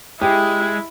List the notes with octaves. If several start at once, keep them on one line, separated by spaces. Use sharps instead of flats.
G#3 E4 G4